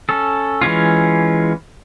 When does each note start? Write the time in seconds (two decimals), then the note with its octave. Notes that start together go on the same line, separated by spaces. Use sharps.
0.09 C#4 A4
0.61 E3 G#3 C#4 F4